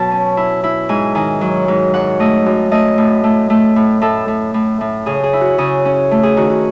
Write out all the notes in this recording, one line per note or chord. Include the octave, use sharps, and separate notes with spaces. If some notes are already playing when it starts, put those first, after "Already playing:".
Already playing: B2 F#3 A5
C#4
E4
E4
G#2 G#5
D#3 G#5
F#3
G#2
F#2 F#5
A3 D#5
F#2
A3 D#5
A2
A3
A3
A2
A2 A4
A2
A2
A2
C#3 G#4
G#4
E4
F#4
C#3 G#4
C#4
A3
G#4
D#3 F#4
F#4